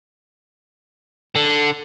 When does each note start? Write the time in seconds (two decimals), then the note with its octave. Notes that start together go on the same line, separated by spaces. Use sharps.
1.36 D3